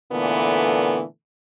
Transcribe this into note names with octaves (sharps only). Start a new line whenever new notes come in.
A#2 D3 E3 A3 B3